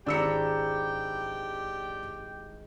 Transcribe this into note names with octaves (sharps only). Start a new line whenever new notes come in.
G#1 D4 E4 G4 G5 A#5 E6 C#7